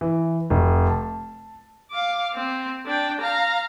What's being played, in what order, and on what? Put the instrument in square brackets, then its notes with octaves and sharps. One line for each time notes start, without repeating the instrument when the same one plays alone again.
[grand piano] E3
F1
A5
[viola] F5 D6
C4
D4 G5
F5 A#5